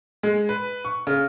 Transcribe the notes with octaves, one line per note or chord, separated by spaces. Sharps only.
G#3
B4
C#6
C#3